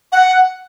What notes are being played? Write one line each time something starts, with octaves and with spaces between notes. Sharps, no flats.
F#5